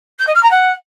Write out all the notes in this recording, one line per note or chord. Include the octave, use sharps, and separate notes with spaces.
G6
D#5
F6
A#5
F#5